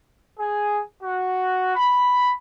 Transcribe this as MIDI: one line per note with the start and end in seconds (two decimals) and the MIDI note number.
0.39 0.81 68
1.03 1.74 66
1.76 2.33 83